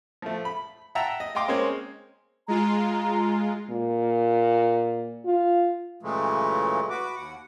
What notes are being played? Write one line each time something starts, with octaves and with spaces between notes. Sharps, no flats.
F3 A3
B5
E5 F#5 G5 A5 A#5 E6
D#5
D#5 F5 G5 C6 D6
G#3 A#3 C4 C#4 C#5
G#3 F4 A#5
A#2
F4
A#2 C#3 E3 F#3 G#3 A3
F#4 B4 D6
D#2 F#5